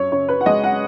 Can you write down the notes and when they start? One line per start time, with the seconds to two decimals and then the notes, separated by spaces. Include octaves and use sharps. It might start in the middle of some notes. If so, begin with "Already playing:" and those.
Already playing: F#2 C#5
0.12 C#3 C#5
0.29 B4
0.41 F#5
0.46 G#3 D#5
0.64 F#5